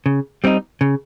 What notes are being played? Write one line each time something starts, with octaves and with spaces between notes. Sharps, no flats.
C#3
G3 C4 D#4
C#3